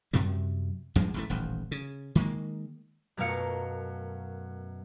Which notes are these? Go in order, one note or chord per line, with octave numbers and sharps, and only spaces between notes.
F#2 C3 F#3 G3
E2 G2 F3 G#3
A1 E3 A3
D#1 A1 D#2
C#3
D#3 G#3 A#3
F#2 B2 A3 A#4 F5 C#7